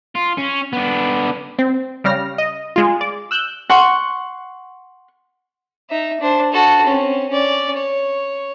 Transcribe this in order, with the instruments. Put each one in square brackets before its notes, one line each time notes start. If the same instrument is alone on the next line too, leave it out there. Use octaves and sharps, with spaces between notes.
[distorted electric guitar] F4
C#4
B3 D4
[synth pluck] C4
C#3 G3 F6 A#6
D#5
G#3 F4
D5
E6 F#6 G6
[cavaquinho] F#5 C6 C#6
[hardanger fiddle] D#4 E5
D4 C5
F#4 A4
C4 C#4
C#4 D5
C#5